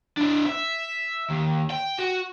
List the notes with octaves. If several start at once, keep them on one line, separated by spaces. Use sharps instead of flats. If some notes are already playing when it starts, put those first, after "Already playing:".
D4 E4
E5
D#2
G5
F#4